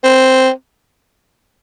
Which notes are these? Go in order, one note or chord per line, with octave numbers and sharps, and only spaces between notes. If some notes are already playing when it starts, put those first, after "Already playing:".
C4